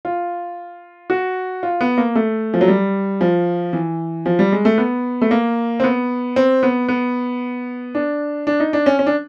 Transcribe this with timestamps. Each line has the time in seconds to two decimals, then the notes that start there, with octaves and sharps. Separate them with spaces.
0.05 F4
1.10 F#4
1.63 F4
1.81 B3
1.98 A#3
2.15 A3
2.54 F3
2.61 F#3
2.68 G3
3.21 F3
3.73 E3
4.26 F3
4.39 G3
4.52 G#3
4.65 A3
4.78 B3
5.21 A3
5.31 A#3
5.80 C4
5.84 B3
6.36 C4
6.63 B3
6.89 B3
7.95 D4
8.47 D4
8.60 D#4
8.73 D4
8.86 C#4
8.99 C#4
9.07 D4